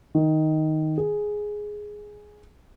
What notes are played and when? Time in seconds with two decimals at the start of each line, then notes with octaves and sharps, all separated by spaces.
0.15 D#3
0.98 G#4